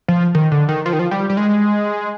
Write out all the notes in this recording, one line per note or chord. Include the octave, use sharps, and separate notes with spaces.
F3
D#3
D3
D#3
F3
D#3
F3
G3
G3
G#3